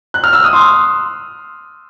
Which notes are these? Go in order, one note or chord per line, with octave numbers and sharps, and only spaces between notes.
F#6
F6
E6
D#6
C6